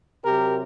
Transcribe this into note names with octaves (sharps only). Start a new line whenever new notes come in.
C3 F#3 G4 A#4